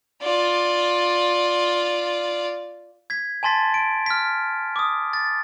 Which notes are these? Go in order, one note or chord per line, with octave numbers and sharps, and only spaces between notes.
F4 D5
G#6 B6
G#5 A5 C6 A6 B6
D7
F6 B6
D6 D#6
A6